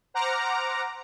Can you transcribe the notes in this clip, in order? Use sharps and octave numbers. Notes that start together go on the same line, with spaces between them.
C5 F#5 A#5 D6 F6 A#6